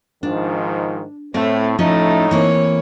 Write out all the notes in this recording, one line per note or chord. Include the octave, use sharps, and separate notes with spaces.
G#2 D#3 F3 D4
A2 A3 C4
A2 F3 A3 C#4 D#4 D#5
E3 A#3 C4 C#5